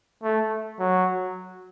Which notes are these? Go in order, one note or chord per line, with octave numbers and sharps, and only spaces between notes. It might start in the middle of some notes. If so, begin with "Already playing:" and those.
A3
F#3